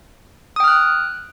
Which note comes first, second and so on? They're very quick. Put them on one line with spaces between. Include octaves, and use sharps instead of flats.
D#6 G5 F6 F#6